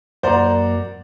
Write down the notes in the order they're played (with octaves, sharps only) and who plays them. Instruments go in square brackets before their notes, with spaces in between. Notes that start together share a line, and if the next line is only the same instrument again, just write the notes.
[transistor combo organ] F#2 A#3 [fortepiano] C5 [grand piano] D5 F#5 A#5